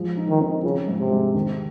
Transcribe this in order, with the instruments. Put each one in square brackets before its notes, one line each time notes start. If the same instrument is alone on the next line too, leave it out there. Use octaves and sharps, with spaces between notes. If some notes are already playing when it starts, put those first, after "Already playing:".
Already playing: [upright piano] F3 G#3
D#4
[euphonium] D#3
[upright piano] C4
[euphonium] C#3 [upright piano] F3
[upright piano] G#2
[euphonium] C3
[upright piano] G#3
D#3